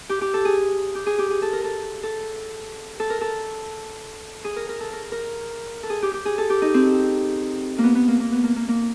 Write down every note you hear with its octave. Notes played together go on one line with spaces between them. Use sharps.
G4
G4
A4
G#4
G4
G#4
G4
G#4
A4
A#4
A4
A4
A4
A#4
A4
G#4
A#4
A#4
A4
A#4
A#4
A4
G#4
G4
G4
G#4
A4
G4
D#4
C4
A#3
B3
B3
A#3
A#3
B3
A#3
A#3
A#3